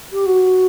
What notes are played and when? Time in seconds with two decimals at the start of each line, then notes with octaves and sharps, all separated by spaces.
0.13 G4
0.26 F#4